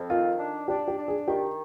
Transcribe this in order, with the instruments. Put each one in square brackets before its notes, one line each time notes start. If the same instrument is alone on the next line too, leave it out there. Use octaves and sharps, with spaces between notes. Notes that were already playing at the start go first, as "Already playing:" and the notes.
Already playing: [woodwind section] F2
[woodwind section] D#3 [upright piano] F4
[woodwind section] D4
[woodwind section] D4 [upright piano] G4
[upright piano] G4
[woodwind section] D4
[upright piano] G#4
[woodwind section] D#3 [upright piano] G4